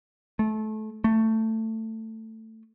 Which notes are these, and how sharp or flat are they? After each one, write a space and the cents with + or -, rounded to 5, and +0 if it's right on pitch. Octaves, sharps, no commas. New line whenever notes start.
A3 -25
A3 +15